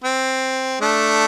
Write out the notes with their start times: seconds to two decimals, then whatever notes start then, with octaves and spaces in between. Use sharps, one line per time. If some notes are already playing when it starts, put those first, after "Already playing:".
0.04 C4
0.81 A3 D4